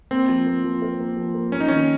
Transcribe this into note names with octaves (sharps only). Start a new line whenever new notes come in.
A#3 C4
F3
A#3
F3
A#4
A#3
F3
A#3
A#3 C#4
D#4
D#3 C#4